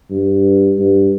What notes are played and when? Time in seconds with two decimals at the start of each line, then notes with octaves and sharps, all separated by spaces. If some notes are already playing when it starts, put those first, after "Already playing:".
0.11 G2
0.79 G2